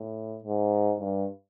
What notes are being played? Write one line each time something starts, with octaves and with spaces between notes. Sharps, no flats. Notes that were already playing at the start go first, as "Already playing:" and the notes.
Already playing: A2
G#2
G2